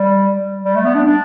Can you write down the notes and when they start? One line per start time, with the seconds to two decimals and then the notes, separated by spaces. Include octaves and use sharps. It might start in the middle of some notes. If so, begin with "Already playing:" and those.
Already playing: G3
0.65 G3
0.76 A3
0.85 B3
0.95 D4
1.06 D4